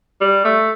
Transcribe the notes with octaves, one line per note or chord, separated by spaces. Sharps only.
G3
A3